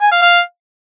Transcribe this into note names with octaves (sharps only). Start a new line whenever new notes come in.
G#5
F5
F5